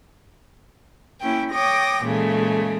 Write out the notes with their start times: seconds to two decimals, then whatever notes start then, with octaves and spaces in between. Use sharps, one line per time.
1.21 A#3 C#4 E4 G5
1.52 C#5 G5 D6 D#6 A#6
2.04 A#2 C#3 E3 G#3 A3